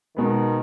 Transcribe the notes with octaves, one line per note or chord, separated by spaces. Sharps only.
B2 D#3 G#3 B3